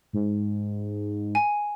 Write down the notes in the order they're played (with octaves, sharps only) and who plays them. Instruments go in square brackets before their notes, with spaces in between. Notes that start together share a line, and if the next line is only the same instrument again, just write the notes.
[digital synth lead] G#2
[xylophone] G#5